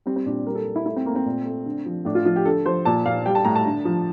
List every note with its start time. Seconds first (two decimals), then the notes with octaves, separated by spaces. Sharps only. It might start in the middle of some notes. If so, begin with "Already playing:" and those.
0.06 G3 C4
0.16 C4
0.26 A#2 D4
0.46 G3 A#4
0.55 A4
0.66 G3
0.76 E4
0.86 A3 E4
0.96 C4
1.06 A3 A#3
1.16 C4
1.26 A#2
1.45 A3
1.66 D3
1.86 F3
2.05 A2 D4
2.15 F4
2.25 F3 F4
2.36 G4
2.45 D3 A4
2.65 F3 C5
2.85 A#2 A5
3.06 A#2 F5
3.26 G3 G5
3.35 A5
3.45 A2 A#5
3.55 A5
3.66 D3
3.85 F3